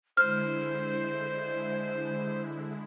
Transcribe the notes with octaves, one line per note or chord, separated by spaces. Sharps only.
D3 G#3 E4 C5 F6